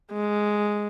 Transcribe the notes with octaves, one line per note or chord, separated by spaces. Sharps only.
G#3